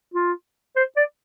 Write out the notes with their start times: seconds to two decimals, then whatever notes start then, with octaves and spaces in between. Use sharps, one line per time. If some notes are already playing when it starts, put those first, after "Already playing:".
0.14 F4
0.76 C5
0.97 D5